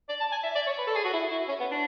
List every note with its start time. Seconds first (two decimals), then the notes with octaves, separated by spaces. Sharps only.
0.09 D5
0.20 A5
0.32 G#5
0.43 E5
0.55 D5
0.67 C#5
0.78 B4
0.87 A4
0.95 G#4
1.04 F#4
1.13 E4
1.30 E4
1.48 C#4
1.60 B3
1.71 D4